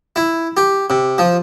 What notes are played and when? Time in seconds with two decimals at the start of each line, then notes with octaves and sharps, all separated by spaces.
0.16 E4
0.57 G4
0.90 C3
1.18 F3